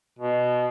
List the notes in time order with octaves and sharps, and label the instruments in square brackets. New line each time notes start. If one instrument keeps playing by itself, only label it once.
[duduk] B2